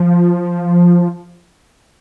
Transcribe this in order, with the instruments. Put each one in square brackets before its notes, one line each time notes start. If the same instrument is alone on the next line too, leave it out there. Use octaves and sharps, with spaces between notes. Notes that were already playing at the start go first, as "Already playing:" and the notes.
Already playing: [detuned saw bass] F3